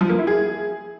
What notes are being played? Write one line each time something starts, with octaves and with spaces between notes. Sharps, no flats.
F3
A#3
E4
G#4